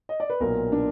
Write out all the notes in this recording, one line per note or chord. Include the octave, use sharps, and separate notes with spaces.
D#5
D5
B4
B1 A#2 A#4
D4